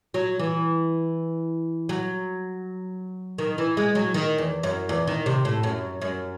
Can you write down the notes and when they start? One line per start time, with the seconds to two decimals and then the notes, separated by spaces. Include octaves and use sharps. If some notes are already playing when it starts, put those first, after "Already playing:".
0.14 F#3
0.39 E3
1.89 F#3
3.38 D#3
3.58 E3
3.77 G#3
3.95 F#3
4.14 D#3
4.38 E2
4.63 F#2
4.89 E2
5.07 D#3
5.26 C3
5.45 A2
5.63 F#2
6.01 F#2